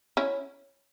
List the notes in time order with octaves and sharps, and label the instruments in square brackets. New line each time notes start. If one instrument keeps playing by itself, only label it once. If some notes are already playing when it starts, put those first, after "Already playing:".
[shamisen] C#4 E4